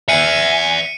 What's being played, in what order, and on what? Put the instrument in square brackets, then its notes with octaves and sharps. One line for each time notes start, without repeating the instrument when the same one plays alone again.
[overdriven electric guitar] E5 F#5 [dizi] G#5 [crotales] C#7 D#7